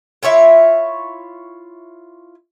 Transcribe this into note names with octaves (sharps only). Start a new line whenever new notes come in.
E4 F4 C#5 E5